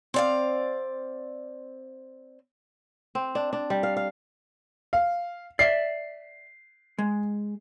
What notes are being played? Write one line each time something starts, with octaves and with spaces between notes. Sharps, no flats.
C4 D5 F5
C4
D4
D4
G3
F5
F5
F5
D5 E5 C7
G#3